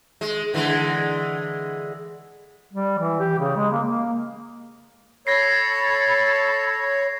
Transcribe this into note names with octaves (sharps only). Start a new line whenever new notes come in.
G#3
D3 E3 G#3
G3
E3
G4
C#3
G#3
A#3
A#3
A4 C#5 B5 G#6 A#6 C7